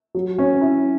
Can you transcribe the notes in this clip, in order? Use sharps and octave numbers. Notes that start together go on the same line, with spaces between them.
F#3
C#4
E4